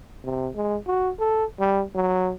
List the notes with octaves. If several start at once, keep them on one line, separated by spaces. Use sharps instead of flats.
C3
G#3
F#4
A4
G3
F#3